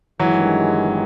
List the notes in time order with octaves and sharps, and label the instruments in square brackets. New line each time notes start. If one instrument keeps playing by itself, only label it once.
[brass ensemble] G1 G2 D#3 G#3 [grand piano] E3 F#3